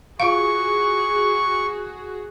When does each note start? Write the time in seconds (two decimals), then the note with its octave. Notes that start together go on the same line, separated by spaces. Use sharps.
0.20 F4 F#4 G#4 F5 C#6